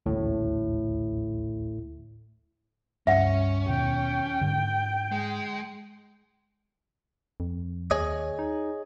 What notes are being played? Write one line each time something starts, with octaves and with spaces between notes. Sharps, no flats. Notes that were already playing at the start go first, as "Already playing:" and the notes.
D#1 A1 D2 A2
C#2 G2 C#4 E5 F#5
D#2 B2 G5
G#2 D3
G#3
F2
D#2 G#4 C#5 D#5
D#4